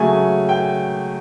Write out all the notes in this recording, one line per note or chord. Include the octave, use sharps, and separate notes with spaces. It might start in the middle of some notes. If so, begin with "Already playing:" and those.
Already playing: C#3 F#3 A3 G#5
G5